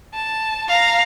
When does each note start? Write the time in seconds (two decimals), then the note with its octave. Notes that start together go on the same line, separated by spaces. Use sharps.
0.14 A5
0.69 F5 A#5